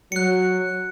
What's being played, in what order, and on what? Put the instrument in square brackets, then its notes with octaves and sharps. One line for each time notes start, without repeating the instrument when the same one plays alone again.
[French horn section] F#3 [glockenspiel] F#6 C#7